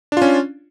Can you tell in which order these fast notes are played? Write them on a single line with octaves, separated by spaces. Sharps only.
D4 F4 C#4